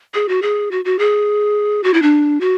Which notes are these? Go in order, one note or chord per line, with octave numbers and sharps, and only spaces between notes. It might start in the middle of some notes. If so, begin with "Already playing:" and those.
G#4
F#4
G#4
F#4
F#4
G#4
F#4
E4
D4
F#4